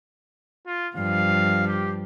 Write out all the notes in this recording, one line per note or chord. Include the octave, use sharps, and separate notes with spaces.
F4
G2 F3 F5
G4